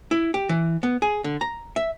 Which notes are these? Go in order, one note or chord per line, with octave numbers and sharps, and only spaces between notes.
E4
G4
E3
B3
G#4
D3
A#5
E5